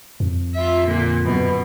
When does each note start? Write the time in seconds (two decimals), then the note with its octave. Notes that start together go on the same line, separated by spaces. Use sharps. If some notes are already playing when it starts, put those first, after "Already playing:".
0.20 F2
0.55 F4 E5
0.87 A#2 D3
1.24 F#2 B2